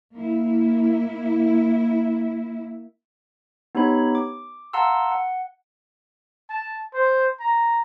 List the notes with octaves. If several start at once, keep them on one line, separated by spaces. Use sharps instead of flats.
A#3 E4
B3 D#4 G4 C#5 B5
D6
F5 F#5 A5 A#5 C6 E6
F#5
A5
C5
A#5